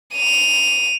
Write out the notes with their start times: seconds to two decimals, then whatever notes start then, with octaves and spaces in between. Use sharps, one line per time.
0.15 D#7 F7